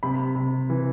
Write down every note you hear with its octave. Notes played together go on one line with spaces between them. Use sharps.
C3 B5
C3
E3